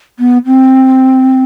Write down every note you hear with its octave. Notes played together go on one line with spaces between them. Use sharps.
B3
C4